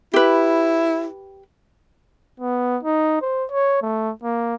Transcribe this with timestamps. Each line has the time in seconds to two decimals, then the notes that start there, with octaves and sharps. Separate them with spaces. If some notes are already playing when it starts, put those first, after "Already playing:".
0.13 E4 G4 B4
2.40 B3
2.83 D#4
3.22 C5
3.51 C#5
3.82 A3
4.24 A#3